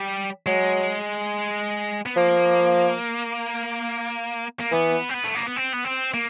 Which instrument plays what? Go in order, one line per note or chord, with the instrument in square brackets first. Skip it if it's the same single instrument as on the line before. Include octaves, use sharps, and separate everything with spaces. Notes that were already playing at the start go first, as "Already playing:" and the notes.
Already playing: [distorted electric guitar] G3
[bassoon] F#3 [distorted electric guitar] G#3
[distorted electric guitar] B3
[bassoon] F3 [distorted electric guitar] A#3
[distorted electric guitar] A#3
[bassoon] E3 [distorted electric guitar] B3
[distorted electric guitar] C4
B3
A3
A#3
B3
C4
B3
C4
A#3